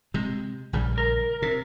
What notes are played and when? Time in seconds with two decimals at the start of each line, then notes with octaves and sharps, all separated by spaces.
0.14 C3 G#3
0.73 A#1 C#3 G3
0.98 A#4
1.42 C3